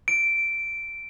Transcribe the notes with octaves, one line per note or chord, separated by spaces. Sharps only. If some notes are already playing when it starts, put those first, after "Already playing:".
D7